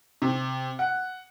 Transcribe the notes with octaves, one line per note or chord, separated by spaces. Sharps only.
C3
F#5